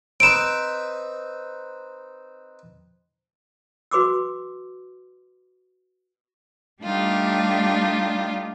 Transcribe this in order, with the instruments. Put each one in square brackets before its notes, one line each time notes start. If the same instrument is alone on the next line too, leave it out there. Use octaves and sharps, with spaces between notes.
[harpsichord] C4 D#4 B4 [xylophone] D7 E7
[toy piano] F#4 B4 C6 D6 E6
[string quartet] G3 A3 D4 D#4 F4 G4